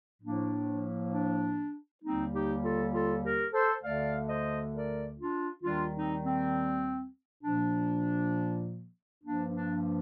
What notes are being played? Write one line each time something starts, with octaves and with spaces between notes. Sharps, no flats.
A2 F3 A#3 D4
D4
D#2 D3 G3 A#3 C4 D#4
D#4 G4
F4 A4
F4 A4
G4 A#4
A4 C5
D2 D3 A3 D5 F5
C5 D#5
A#4 D5
D4 F4
D#2 D#3 G3 D4 F4
C4 D#4
C4
A#2 F3 A#3 D4
G2 F3 A#3 D4
D4
D4